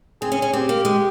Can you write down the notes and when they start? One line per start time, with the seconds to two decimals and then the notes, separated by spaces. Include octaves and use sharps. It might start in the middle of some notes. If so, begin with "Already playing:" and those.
0.22 C4 G#4
0.32 C#4
0.42 C#4
0.53 C4 G4
0.69 A#3
0.85 G#3